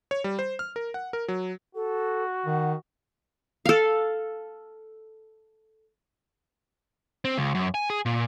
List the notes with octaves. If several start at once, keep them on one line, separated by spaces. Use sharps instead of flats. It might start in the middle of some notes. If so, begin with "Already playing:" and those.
C#5
G3
C5
F6
A#4
F#5
A#4
F#3
F#4 A4
D#3 F#5
A4 F5
C4
C#2
F#2
G#5
G#4
A#2